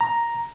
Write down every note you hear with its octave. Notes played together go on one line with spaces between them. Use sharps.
A#5